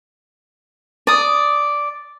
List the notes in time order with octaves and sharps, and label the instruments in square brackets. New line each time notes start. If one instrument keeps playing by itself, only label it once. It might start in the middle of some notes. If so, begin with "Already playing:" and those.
[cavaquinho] D5 D#6